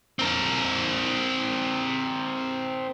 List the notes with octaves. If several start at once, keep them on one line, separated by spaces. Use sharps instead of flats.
C4 A#4